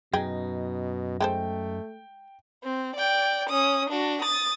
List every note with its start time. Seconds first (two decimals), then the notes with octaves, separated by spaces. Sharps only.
0.13 F#2 B2 D#4 G#4 G5
1.20 G#3 A3 A4 C5 G5
2.64 C4
2.96 D5 G5
3.49 C#4 D#6
3.90 D4 F#4
4.22 D#6 A6